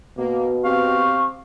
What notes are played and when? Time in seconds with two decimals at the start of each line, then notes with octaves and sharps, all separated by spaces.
0.18 B2 A#3
0.64 C4 G4 F5 C#6